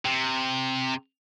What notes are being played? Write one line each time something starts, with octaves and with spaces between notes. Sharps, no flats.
C3